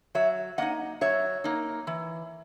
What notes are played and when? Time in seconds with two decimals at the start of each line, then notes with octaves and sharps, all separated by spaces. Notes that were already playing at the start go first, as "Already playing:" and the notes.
0.15 F#3 C#5 E5
0.58 A#3 D#4 D#5 F#5
1.01 F#3 C#5 E5
1.44 A#3 D#4
1.87 E3